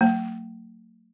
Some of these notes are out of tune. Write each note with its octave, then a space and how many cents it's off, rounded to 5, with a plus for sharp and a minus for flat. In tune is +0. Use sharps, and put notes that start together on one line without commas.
F#3 +0 A#3 -45